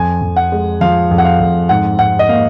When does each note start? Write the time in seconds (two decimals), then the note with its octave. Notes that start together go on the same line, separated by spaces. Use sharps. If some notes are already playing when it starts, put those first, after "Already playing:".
Already playing: F2 G#5
0.22 F2
0.36 F#5
0.52 G#3
0.81 F3 F5
1.11 F2
1.18 F#5
1.25 F5
1.40 F2
1.69 G#2 F#5
1.99 G#2 F#5
2.19 D#5
2.28 A#3 F5